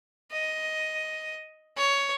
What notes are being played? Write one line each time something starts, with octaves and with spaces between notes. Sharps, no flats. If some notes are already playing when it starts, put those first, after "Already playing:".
D#5
C#5